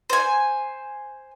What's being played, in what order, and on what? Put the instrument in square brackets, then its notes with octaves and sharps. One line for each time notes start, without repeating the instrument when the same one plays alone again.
[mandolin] C5 G#5